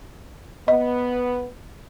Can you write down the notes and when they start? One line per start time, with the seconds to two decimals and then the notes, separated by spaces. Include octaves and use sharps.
0.68 B3 D#5